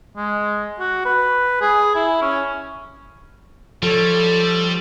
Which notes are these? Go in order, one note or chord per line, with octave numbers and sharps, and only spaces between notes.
G#3
F#4
B4
G#4
E4
C#4
F3 G3 A4 C#5